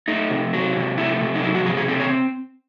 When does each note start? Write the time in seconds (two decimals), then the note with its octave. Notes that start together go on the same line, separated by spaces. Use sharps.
0.08 A3 D#4
0.30 C3
0.53 F#3
0.76 C3
0.98 A3 E4
1.21 C3
1.35 D#4
1.43 F#3 E4
1.55 F#4
1.65 C3 G#4
1.77 G#4
1.88 C4 A4
2.00 C#5